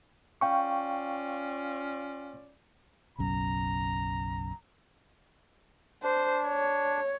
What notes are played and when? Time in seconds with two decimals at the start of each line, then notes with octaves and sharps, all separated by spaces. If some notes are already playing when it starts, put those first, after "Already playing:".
0.41 C#4 F4 D5 F5 G5 C#6
3.19 F#1 B1 F#2 A#5
6.03 D4 C5
6.48 C#5